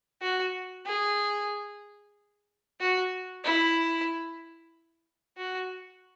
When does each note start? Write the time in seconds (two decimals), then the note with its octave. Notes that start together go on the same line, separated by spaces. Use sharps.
0.22 F#4
0.86 G#4
2.80 F#4
3.45 E4
5.38 F#4